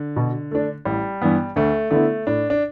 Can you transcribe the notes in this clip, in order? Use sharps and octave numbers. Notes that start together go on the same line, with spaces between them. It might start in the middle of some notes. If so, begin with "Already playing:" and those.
Already playing: D3
B2
A3 D4
A1 G3
G2 E3 B3
D2 A3
D3 A3 B3 E4
A2 D4
D4